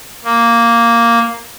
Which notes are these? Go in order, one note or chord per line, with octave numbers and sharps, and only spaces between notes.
A#3